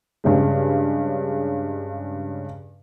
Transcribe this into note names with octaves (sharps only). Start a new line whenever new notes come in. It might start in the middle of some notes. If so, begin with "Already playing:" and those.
G2 C#3 G#3